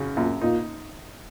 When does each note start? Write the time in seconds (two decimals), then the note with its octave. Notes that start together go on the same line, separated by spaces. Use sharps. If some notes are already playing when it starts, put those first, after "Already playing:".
Already playing: F#2 C#3
0.16 F#2 A#2 A#3
0.42 A#2 A#3 D#4